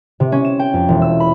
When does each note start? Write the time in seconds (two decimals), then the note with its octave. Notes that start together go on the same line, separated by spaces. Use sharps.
0.20 C3
0.32 C#4
0.45 E7
0.59 G5
0.73 F2
0.89 E1
1.02 E6
1.20 B5